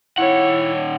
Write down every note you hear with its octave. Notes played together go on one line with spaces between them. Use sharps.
D#3 E4 C#5 F#5